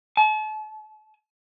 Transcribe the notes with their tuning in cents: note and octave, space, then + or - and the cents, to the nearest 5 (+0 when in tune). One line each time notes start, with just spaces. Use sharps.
A5 -40